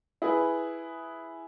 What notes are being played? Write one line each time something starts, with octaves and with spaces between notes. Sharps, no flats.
E4 G#4 B4